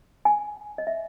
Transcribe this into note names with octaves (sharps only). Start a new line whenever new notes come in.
G#5
D#5
E5